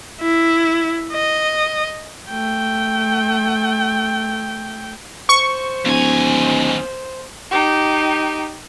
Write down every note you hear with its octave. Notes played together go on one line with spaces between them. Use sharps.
E4
D#5
A3 G5
C5 C#6
D1 D#2 G#5
D#4 G4